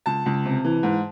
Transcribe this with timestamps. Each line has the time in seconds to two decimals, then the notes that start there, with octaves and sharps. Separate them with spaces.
0.06 C#2 A5
0.26 C#2
0.45 C3
0.65 E3
0.83 G#2